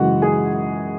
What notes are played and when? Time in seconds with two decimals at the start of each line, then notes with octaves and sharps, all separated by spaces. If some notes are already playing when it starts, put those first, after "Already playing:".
Already playing: F#2 C#3 E3 G#3 F#4 F#5
0.22 G#4 G#5